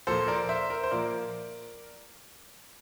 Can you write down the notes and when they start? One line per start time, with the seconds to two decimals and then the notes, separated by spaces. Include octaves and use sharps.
0.07 A#2 F3 A#3 A4 C5
0.28 A#4 D5
0.49 C5 E5
0.70 A#4
0.84 C5
0.91 A#2 F3 A#3 A#4 D5